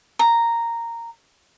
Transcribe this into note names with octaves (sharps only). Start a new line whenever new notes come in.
A#5